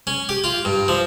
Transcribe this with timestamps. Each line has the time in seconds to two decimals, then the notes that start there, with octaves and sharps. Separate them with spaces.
0.07 C#4
0.29 G4
0.44 F4
0.65 G2
0.88 F3